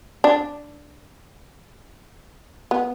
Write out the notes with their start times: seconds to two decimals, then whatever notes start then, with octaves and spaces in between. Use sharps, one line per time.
0.24 D4
2.71 B3